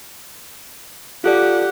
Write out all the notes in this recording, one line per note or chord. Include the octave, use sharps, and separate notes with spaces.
F4 G4 A4 D5 F#5